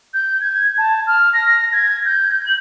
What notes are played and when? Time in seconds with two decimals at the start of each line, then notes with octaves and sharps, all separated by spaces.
0.14 G6
0.41 G#6
0.78 A5
1.07 F6
1.33 A#6
1.73 G#6
2.06 G6
2.46 F#7